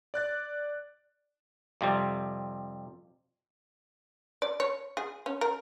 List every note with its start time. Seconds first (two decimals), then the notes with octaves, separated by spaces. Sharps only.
0.14 D5 F#6 A6
1.81 F2 C3 G3
4.42 D5
4.60 C#5
4.97 G#4
5.26 C#4
5.41 A#4